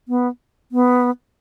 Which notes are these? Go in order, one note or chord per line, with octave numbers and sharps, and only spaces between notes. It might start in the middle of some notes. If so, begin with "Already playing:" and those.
B3
B3